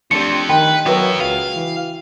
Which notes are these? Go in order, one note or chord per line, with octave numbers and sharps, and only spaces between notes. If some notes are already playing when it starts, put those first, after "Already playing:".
F3 A3 C4 D4 G4 C#7
D#3 B4 G5
F#3 B3 F#4 A#4 B4 E5
C#2 F5
E3